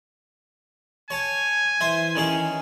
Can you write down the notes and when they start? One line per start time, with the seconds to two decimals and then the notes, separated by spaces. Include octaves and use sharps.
1.10 C#5 G#5 A5
1.81 E3 C5 E5
2.15 D#3 C#4 G#4